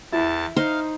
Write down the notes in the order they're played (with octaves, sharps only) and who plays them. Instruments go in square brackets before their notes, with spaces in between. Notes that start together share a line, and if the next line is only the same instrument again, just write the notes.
[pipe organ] E2 A5 [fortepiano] E4
[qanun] D#4 C5 [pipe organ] F5